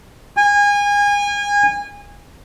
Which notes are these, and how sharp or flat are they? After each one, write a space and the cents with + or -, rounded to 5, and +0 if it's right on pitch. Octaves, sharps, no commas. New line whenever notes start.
G#5 -30